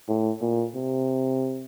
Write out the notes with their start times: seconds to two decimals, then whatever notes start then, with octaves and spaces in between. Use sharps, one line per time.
0.08 A2
0.42 A#2
0.75 C3